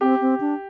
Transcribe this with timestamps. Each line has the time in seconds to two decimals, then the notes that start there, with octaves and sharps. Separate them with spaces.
0.01 C4 G4
0.21 C4
0.40 D4